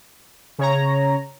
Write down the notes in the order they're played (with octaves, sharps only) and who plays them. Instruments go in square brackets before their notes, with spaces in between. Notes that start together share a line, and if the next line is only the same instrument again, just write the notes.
[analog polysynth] C#3 C#5 A#5